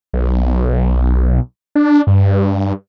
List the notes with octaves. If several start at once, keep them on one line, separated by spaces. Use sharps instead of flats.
B1
D4
G2